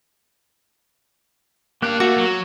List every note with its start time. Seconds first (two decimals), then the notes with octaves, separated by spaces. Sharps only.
1.82 A#3 D4 G4 F#6
2.00 A3 F#4
2.17 F#3